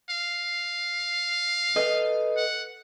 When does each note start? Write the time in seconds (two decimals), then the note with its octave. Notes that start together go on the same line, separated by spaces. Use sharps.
0.10 F5
1.76 A4 B4 D#5
2.37 F#5